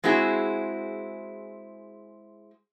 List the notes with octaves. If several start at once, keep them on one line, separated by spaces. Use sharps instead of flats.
G#3 C4 E4 F#4 G#4